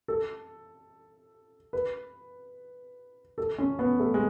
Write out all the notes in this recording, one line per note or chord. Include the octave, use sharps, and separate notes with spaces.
A4
B4
A4
C#4
B3
A3
G#3